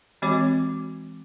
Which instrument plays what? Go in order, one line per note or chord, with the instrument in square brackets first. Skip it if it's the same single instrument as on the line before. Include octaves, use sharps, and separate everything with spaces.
[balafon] E3 G#3 C4 F#4 C#5 D6